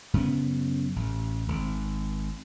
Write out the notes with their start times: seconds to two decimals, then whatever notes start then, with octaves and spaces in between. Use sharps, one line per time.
0.14 F#2 C#3 B3
0.96 A1
1.48 G#1